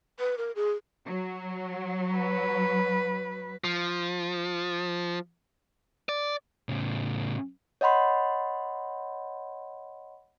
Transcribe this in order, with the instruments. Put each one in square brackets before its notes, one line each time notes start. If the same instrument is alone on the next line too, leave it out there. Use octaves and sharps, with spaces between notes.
[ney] B4
A#4
G#4
[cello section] F#3
[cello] B4
[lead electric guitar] F3
D5
[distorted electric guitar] A2 C#3
[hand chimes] C#5 D#5 F#5 B5 C6